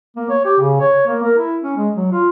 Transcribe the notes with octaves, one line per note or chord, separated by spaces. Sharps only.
A#3
C#5
G4
C#3
C#5
A#3
A#4
E4
C#4
G#3
F#3
F4